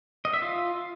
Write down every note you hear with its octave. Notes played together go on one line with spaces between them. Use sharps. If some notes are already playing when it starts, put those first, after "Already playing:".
D#5
E5
F4